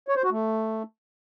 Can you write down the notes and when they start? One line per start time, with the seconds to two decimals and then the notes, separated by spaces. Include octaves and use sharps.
0.08 C#5
0.16 C5
0.24 F#4
0.31 A3